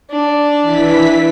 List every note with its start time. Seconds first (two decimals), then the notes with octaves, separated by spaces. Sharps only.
0.11 D4
0.62 E3 B6